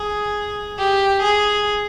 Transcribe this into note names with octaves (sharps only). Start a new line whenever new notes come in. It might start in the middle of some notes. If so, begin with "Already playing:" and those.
Already playing: G#4
G4
G#4